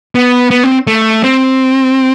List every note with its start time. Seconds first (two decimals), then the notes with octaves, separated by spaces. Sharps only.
0.15 B3
0.51 B3
0.63 C4
0.87 A3
1.24 C4